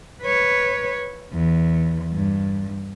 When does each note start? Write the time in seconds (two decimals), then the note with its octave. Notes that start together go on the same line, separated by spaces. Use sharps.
0.22 B4 C#5
1.33 E2
2.13 G2